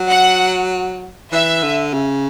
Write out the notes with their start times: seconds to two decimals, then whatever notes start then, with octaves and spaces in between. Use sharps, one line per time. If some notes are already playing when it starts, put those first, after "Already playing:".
Already playing: F#3
0.10 F#5
1.32 E3 E5
1.63 D3
1.93 C#3